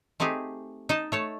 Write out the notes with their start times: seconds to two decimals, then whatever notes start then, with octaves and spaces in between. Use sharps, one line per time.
0.20 A3 C4 D#4 G4 G#4
0.89 D#4 D#5 A5
1.12 A3 C#5 A5